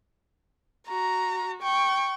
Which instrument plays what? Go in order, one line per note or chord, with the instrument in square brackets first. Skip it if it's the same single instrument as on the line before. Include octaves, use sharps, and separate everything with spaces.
[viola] F#4 [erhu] A#5
[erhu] G5 [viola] C#6